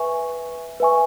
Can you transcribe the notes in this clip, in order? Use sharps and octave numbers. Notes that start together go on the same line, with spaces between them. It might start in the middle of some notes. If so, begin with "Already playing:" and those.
Already playing: B4 E5 G#5 C#6
B4 E5 G#5 C#6